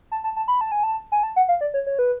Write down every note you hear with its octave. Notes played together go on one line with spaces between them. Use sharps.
A5
A5
A5
B5
A5
G#5
A5
G#5
A5
F#5
F5
D5
C#5
C#5
B4